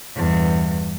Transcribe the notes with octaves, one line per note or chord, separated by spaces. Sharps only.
E2 G2